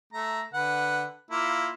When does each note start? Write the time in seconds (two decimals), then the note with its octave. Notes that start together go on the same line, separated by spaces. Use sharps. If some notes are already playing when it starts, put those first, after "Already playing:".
0.13 A3 A#5
0.54 D3 B4 F#5
1.31 A#3 E4 F4